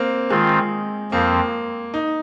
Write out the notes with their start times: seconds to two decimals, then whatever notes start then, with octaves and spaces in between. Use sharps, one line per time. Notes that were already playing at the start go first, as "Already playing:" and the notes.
Already playing: A#3 C4
0.30 D#3 G#3 C4 F4
1.12 F2 F3 A#3 C4
1.94 D#4